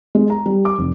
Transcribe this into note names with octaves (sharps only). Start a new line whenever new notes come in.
G#3
A#5
G3
D6
F1